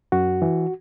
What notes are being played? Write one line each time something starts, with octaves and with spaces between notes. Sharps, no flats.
F#2 F#4
E3